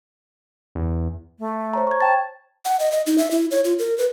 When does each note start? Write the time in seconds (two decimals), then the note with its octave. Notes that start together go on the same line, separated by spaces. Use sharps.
0.75 E2
1.39 A3
1.73 C5 C#5 A#5
1.87 C#6 G#6
2.00 G5 A5 A6
2.65 F#5
2.80 D#5
2.92 D#5
3.06 D#4
3.18 E5
3.31 E4
3.51 C#5
3.65 F4
3.79 A#4
3.98 B4